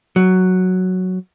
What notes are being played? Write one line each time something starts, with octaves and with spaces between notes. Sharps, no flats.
F#3